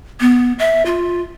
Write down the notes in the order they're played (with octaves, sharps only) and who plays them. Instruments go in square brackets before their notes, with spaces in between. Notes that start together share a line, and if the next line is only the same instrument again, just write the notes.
[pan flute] B3
E5
F4